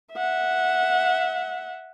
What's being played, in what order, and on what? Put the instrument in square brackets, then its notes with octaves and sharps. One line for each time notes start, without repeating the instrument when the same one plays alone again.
[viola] E5 F#5